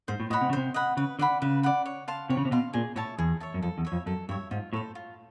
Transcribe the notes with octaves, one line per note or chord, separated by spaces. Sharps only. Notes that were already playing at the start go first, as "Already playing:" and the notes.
G#2 C5
A2
A2 D#5 F#5 B5
C3
C#3
C3 C5
D#5 F#5 B5
C#3 B4
D3 D5 F#5 B5
C#3 B4
D5 F#5 B5
C#5
F5 A5 C6
C3 C#5
C#3
C3
B2 F5 A5 C6
A#2 G#4
A2 C#5 E5 A5
E2 G#4
C#5 E5 A5
F#2
F2 A4
E2
C#5 E5
F2
F#2 A4
G2 C#5 E5
G#2 F4
A2 A4 C5
F4